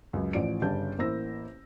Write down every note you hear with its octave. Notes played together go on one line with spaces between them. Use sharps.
C#2 F#2
A1 A2 F3 D5 D7
G1 C#3 G3 A5 G6
A1 A#3 E4 C5 E6 A#6